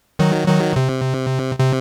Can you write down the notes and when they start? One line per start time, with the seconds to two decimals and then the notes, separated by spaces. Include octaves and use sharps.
0.19 D#3 F#3
0.48 D#3 F#3
0.76 C3
1.60 C3